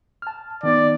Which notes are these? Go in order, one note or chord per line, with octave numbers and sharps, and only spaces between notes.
A5 F6
D#3 B3 D#4 D5